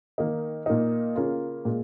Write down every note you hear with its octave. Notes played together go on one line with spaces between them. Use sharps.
D#3 A#3 D#4
A#2 A#3 D#4
C#3 A#3 C#4 F4
A#2 G#3